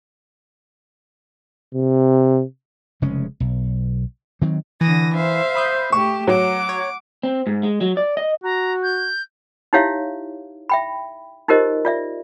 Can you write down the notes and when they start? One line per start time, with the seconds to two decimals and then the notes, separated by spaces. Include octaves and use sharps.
1.74 C3
3.02 F1 C#3 G#3 C#4
3.40 B1
4.42 D#3 F#3 C4
4.81 D3 E3 D#6 A#6
5.15 C5 E5 F5
5.55 B5 D#6 G6
5.92 A3 G4 C#6 E7
6.27 F#3 F#5 D6
6.69 C#5
7.23 C4
7.47 G#2
7.63 G#3
7.81 F#3
7.97 D5
8.17 D#5
8.43 F#4 A#5
8.82 G6
9.73 D#4 E4 G4 C#5 E5 F5
10.70 E5 G5 B5
11.48 D#4 F4 G4 A#4 C5 D#5
11.85 F4 D5 E5